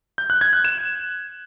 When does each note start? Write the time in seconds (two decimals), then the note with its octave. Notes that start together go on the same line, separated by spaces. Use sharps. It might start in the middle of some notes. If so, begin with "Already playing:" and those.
0.18 G6
0.30 F#6
0.41 G#6
0.53 F#6
0.65 E7